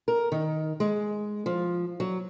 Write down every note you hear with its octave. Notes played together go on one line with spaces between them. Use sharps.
A#4
D#3
G#3
F3
F#3